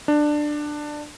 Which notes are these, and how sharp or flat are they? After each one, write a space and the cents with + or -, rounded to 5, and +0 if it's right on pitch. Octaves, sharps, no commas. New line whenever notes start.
D4 +15